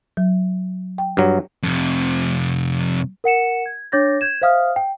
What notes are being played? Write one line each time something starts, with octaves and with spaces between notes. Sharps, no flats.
F#3
G5
G2 F#3
F2 C3
A#4 F#5 C#7 E7
G#6
D4 C#5 D6 G6 A6 A#6
G6 G#6 E7
C5 E5 F5 D#6 F6
G5